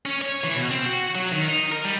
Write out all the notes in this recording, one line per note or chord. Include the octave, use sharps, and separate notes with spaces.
C#4
C#5
E3
B2
C4
F#4
F#3
D#3
D#4
A#4
G3